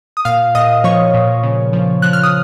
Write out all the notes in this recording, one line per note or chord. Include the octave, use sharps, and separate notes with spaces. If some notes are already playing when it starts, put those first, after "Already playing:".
D#6
A#2 F5 F6
A#2 D#5 D#6
F3 C#5 C#6
A#2
C#3
F3
F3 F#6
F6
D#6